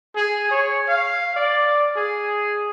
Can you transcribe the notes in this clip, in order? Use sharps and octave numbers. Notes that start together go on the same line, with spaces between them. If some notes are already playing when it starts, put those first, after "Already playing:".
G#4
C#5
F5
D5
G#4